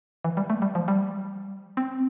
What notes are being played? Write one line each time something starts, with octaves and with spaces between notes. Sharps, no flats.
E3
G3
A3
G3
F3
G3
C4